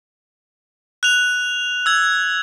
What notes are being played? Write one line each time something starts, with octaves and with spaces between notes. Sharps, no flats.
F#6 F7
E6 G#6